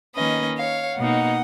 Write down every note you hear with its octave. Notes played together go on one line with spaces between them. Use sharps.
D#3 A#3 C#4 B4 D#5
C#5 F5
B2 A#3 D#4 D#5 F#5